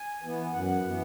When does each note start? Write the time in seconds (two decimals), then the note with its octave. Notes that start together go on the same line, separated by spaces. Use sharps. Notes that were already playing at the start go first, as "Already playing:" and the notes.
Already playing: G#5
0.22 E3 B3
0.53 F#2 F#5
0.85 E3 B3